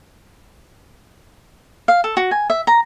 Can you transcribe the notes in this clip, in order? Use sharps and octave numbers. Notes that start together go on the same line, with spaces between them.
F5
A4
F#4
G#5
E5
A#5